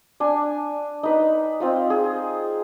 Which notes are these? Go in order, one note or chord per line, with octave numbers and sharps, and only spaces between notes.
D4 G#5
D#4 B4
C4 F4 D#5
G#4